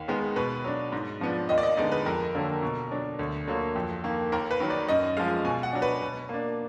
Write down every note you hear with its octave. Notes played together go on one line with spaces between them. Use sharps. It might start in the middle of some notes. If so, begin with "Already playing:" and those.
Already playing: D#2
D#3 G#3 B3
B2 B4
F#3 D4
G#2
F3 B3 D4
D#2 D#5
D5
D#5
D3 G#3 B3 D#4 D5
B4
F2 A#4
D3 F#3 A#3
B2
F#3 D4
D2
D3 F#3 A#3
F2
D#3 A#3
D#2 A#4
B4
D#3 F#3
D5
F#2 D#5
F3 G#3 F5
B2 G#5
F#5
F#3 D4
B4
B2
A#3 D4